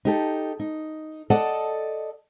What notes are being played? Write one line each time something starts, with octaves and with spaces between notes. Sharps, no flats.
D#4 G4 A4
D#4
A4 D5 D#5 F#5 A5